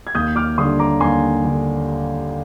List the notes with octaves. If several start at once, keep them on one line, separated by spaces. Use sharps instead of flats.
G#6
D#2 D#6 G6
D6 F6
D3 G3 D4 C6 D#6
A#5 D6
D#2 G#5 C6
D3